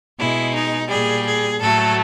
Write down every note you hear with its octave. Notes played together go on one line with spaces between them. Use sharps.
B2 G#3 E4
D#4
A#2 G3 G#4
G#4
A2 F#3 A3 A4